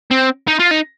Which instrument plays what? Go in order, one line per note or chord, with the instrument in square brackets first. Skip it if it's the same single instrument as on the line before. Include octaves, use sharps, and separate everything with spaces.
[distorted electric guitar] C4
D#4
F4
D#4